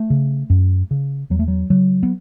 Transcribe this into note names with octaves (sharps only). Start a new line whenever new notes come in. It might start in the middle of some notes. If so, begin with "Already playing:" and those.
Already playing: A3
C#3
F#2
C#3
E2 F#3
A3
F#3
C#3 F#3
B3